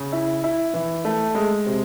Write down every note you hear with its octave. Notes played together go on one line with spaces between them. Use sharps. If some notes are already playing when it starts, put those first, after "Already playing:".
Already playing: C#3
E4
E4
E3
A3
G#3
C3